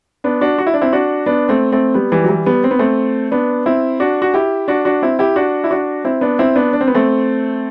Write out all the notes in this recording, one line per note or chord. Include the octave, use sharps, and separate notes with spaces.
B3 D4
D4 F#4
F#4
E4
D4
C4 E4
D4 F#4
B3 D4
A3 C4
A3 C4
G3 B3
E3 G3
F#3
E3 G3
G3 B3
C4
B3
A3 C4
B3 D4
C4 E4
D4 F#4
F#4
E4 G4
D4 F#4
D4 F#4
C4 E4
E4 G4
D4 F#4
E4
D4 F#4
C4 E4
B3 D4
C4 E4
B3 D4
D4
C4
B3
A3 C4